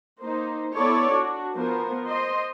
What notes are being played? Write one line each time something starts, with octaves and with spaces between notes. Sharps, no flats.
A#3 D#4 C5
B3 E4 A4 C#5 D5
D4 F#4
F3 B3 A#4 C5
C5 D#5 C6